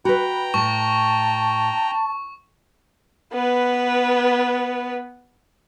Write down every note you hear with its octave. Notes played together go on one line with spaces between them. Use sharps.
F#4 B4 G5 A#5 B5
A2 A5 C#6
B3 B4